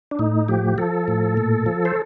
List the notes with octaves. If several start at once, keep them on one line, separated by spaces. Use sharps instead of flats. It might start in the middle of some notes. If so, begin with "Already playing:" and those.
D4
A2 D#4
F3 G4
F3 A4
A2
A#2
F3
C5